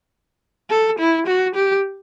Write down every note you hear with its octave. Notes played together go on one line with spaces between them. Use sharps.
A4
E4
F#4
G4